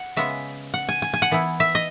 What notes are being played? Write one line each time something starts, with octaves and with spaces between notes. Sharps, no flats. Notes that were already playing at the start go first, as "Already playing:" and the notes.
Already playing: F#5
C#3 G#3 B3 E5
F#5
G#5
G#5
G#5
F#5
E3 B3 E4
E5
D#5